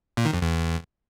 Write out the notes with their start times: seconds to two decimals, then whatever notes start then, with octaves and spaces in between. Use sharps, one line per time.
0.17 A#2
0.25 D#3
0.34 F2
0.42 E2